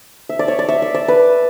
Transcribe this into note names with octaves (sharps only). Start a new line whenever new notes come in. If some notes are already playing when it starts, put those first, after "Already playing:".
E5
D5
C#5
D5
E5
E5
D5
B4